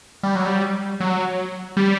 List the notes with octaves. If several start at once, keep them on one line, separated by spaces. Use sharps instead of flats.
G3
F#3
G3
F#3
G3